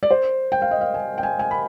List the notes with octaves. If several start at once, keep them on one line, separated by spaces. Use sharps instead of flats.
D5
C5
G5
F5
D#5
F5
G#5
G5
G#5
G#5
B5